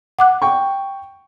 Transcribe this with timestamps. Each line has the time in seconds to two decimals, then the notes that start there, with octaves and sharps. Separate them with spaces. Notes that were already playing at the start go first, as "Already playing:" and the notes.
0.19 F#5 D6 F#6
0.42 G5 C#6